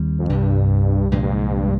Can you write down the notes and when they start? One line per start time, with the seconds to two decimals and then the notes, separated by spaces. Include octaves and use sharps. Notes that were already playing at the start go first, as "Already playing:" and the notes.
Already playing: D#2 D#3 G3 C4
0.19 F2
0.29 C2 G2 C3 G3
1.11 C2 G2 A#2 F3 G#3
1.22 G2
1.32 G#2
1.52 G2